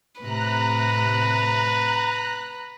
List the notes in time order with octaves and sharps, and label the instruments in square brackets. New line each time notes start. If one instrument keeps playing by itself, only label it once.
[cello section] A2 C3 [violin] B4 [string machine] A#5 F#6